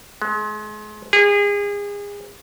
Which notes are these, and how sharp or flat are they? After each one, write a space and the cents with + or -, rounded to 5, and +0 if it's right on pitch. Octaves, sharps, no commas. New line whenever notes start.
G#3 +35
G#4 -30